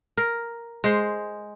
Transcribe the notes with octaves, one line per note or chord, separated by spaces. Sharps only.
A#4
G#3 C5